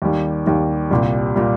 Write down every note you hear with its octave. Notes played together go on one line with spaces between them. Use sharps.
D#2 D#3 G3
D#2 D#3 G3
C2 A#2 G3
A#2 G3